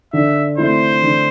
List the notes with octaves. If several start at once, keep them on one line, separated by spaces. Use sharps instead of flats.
D3 E5
A3 C4 E4 C5
D3